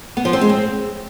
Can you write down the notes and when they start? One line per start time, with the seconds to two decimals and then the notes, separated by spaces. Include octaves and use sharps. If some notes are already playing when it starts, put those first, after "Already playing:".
0.17 B3
0.25 F3
0.33 C4
0.41 G#3
0.50 C4